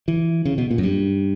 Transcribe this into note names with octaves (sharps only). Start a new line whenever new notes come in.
E3
C#3
B2
A#2
F#2
G2